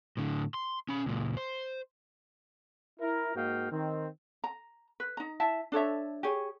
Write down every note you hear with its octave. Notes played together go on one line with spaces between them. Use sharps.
A2 D3
C6
C#4 B5
C#2 A#2
C5
E4 A#4
G#2 A#3 F#4 D#5 F5 G5
D#3 C4
A#5
B4
D#4 A#5
E4 E5 A5
D4 A4 C#5 E5
G4 G#4 C#5